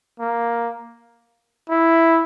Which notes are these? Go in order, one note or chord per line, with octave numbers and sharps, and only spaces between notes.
A#3
E4